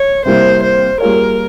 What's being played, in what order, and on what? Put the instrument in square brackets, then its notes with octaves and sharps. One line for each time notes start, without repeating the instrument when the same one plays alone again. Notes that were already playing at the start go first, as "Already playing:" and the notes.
Already playing: [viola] C#5
[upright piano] C3 G3 A#3 E4 [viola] C5
[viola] C5
[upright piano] G3 A#3 F4 G#4 C#5 [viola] A#4